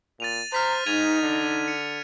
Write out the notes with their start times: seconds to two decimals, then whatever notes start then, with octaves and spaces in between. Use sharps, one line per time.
0.20 A#2 A6 D#7 F7
0.53 C5 A#5 F6 B6 F7
0.86 G#2 D#4 G#6 D#7 F7
1.22 D3
1.68 C#7